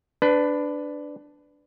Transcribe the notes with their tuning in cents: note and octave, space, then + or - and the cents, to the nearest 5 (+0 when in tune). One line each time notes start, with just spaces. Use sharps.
D4 +0 B4 +20